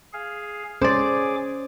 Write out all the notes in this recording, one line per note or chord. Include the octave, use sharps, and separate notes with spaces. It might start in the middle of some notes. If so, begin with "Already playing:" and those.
G#4 F5
C#4 G#4 C5 D5 D6